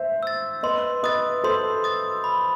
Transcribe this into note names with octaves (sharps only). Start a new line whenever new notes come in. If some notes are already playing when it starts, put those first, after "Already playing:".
Already playing: C5 E5
E6 A6
B4 D#5 C6
B4 D#5 D#6 A6
A4 C5 C6
D#6 A6
B5